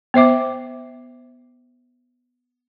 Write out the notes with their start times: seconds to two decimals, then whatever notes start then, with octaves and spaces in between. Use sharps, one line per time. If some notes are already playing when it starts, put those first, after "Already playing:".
0.14 B3 C5 E5 D6